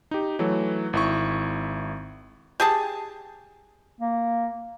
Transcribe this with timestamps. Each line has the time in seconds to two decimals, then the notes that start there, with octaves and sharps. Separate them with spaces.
0.11 D#4 G4
0.39 E3 F#3 A3
0.93 G#1 E4 C#6
2.60 G4 G#4 A5
4.01 A#3